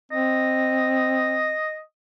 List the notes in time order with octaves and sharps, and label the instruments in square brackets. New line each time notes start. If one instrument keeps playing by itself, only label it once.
[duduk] C4 [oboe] D#5